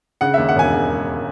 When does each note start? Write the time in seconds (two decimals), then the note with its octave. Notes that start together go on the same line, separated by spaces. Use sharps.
0.21 C#3 F#5
0.34 D#2 E5
0.49 F#5
0.56 E1 G#5